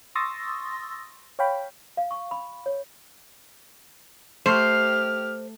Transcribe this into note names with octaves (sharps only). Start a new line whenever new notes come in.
C6 C#6 D#6 E6 A6 A#6
C#5 F5 G5 B5
F5
C#6
B5
C#5
A3 G4 C5 F6 C7